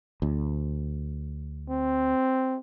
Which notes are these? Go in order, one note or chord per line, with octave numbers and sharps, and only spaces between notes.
D2
C4